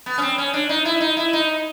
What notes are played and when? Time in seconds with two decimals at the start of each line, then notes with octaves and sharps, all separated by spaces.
0.06 B3
0.18 C#4
0.22 C4
0.38 C#4
0.54 D4
0.69 D#4
0.85 E4
1.00 D#4
1.17 E4
1.33 D#4